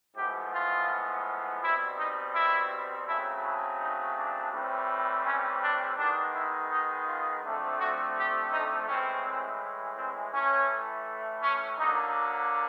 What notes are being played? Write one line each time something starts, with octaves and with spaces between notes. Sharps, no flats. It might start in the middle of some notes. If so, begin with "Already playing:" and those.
A2 F3 G#3 B3 G4
F4
B2 G3 C4 E4
D#4
E4
C#3 F#3 A3 C4 E4
E4
D#4
D4
A2 E3 G3 C4
C#4
D4
D#3 G#3 B3 D4
E4
D#4
F4
D3 F3 A3 C4
F#4
G4
D#4
A2 E3 G#3 C4 C#4
C4
C4
A2 E3 A3 C#4
C#4
D3 F#3 A#3 D#4